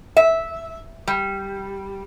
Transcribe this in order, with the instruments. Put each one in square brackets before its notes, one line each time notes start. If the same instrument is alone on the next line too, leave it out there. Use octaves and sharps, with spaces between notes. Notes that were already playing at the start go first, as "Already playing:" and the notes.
[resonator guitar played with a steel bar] E5
G3